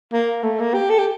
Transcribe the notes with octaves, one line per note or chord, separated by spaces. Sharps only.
A#3
A3
A#3
G4
A4
G4